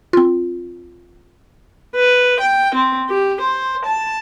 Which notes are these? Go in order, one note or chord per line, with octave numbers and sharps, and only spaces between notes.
C4 F4
B4
G5
C4
G4
C5
A5